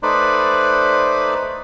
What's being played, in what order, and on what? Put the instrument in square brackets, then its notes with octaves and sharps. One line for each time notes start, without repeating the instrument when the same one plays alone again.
[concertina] A3 D#4 B4 C5 D5 B5